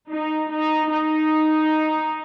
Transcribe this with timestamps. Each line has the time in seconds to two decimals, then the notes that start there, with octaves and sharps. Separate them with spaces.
0.12 D#4
0.53 D#4
0.92 D#4